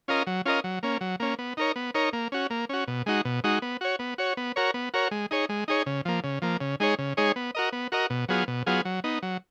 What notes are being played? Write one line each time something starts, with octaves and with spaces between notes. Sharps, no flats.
C#4 F4 A#4 D#5
F#3
C#4 F4 A#4 D#5
F#3
A#3 C#4
F#3
A#3 C#4
B3
D#4 A#4 C#5
B3
D#4 A#4 C#5
A#3
C#4 F#4
A#3
C#4 F#4
B2
G#3 D#4 F#4
B2
G#3 D#4 F#4
B3
F#4 C#5
B3
F#4 C#5
B3
F#4 A#4 C#5
B3
F#4 A#4 C#5
G#3
D#4 G#4 C#5
G#3
D#4 G#4 C#5
C#3
F3 A#3
C#3
F3 A#3
C#3
G#3 D#4 G#4 C#5
C#3
G#3 D#4 G#4 C#5
B3
F#4 A#4 D#5
B3
F#4 A#4 D#5
B2
F#3 B3 F4 G#4
B2
F#3 B3 F4 G#4
F#3
B3 D#4
F#3